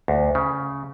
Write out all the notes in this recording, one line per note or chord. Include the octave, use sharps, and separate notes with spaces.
D2
C#3